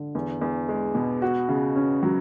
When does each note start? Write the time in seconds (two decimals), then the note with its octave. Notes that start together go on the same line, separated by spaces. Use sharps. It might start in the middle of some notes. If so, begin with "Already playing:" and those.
Already playing: D3
0.15 E2
0.41 E2
0.69 G#3
0.95 B2
1.22 F#4
1.49 C#3
1.76 C#4
2.03 F#3